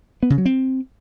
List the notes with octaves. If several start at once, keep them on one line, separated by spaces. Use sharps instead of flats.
B3
C#3
F#3
C4